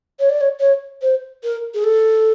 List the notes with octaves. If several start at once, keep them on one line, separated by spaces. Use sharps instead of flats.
C#5
D5
C#5
C#5
C5
A#4
G#4
A4